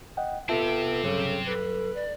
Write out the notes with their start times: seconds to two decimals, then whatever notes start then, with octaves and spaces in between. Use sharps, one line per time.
0.17 D#5 F#5 G5
0.49 B3 C4 F4 G4 A4 E5 A5
1.03 G2 C#3 F#3
1.47 A4 B4
1.95 D5